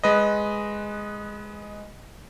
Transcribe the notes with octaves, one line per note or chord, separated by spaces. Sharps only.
G#3 B4 D#5